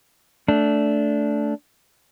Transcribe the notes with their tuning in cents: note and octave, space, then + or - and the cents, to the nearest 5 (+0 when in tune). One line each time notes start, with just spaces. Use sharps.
A3 +0 D4 -15